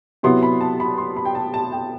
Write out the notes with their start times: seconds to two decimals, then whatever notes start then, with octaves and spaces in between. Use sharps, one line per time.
0.23 C3 F#3 B3 E4 C6
0.43 B5
0.61 A5
0.80 B5
0.98 C6
1.16 B5
1.25 G5
1.35 A5
1.54 A5
1.72 G5